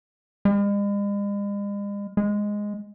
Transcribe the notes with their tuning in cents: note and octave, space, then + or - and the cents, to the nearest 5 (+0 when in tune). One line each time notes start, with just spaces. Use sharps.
G#3 -45
G#3 -5